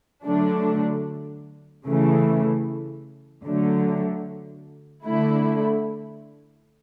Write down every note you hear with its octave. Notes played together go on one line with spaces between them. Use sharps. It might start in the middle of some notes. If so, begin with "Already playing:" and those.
D3 F#3 A3 D4
C#3 E3 A3
D3 F#3 A3
D3 A3 E4